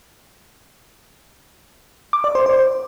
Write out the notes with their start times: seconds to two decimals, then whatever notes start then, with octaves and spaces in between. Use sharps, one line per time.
2.13 D6
2.24 D5
2.35 C5
2.46 C5